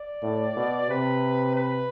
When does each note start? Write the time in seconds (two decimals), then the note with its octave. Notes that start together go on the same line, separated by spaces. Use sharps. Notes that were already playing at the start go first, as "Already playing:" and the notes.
Already playing: D5
0.23 A2
0.57 B2
0.89 C3 B4
1.56 B4